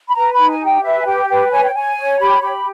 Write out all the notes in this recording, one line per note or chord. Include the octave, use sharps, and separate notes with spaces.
B5
B4 A#5
B5
D#4
G#5
G4
G5
B4 E5
G#5
G4 G5
B4 G5
C#5 G#5
G5
C#5 G#5
C#5
G4 B5
G4 B5